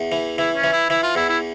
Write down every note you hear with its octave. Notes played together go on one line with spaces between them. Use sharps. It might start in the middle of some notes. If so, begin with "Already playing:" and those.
Already playing: E2
E3
E3 E4
C#4
E3
E4
E3 E4
F4
E2 E4
E4